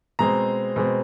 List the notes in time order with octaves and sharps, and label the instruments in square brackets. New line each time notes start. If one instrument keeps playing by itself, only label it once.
[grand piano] B2 G#3 C4 A#5
B2 G#3 C4